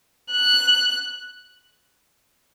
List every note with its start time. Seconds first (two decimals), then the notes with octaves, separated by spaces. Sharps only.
0.31 F#6